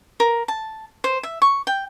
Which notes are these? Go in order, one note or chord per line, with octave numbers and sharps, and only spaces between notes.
A#4
A5
C5
E5
C#6
G5